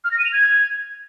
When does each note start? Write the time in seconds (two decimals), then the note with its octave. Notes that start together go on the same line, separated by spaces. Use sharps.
0.04 F6
0.11 A#6
0.18 D#7
0.25 F7
0.32 G#6